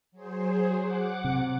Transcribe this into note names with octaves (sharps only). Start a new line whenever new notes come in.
F#3 G#4 C5
F#5 D6
C3